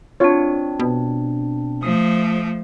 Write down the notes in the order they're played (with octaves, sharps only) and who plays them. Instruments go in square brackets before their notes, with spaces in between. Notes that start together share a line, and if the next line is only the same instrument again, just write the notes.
[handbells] C4 D4 [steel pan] F4 C#5
[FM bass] B2
[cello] F3 A3 [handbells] D#6